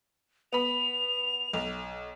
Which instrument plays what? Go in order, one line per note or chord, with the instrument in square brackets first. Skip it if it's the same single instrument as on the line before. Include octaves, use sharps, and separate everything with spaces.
[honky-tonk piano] B3 B5 [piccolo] F7
[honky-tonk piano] B1